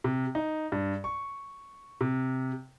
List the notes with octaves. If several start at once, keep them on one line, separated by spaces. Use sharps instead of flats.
C3
D#4
G2
C#6
C3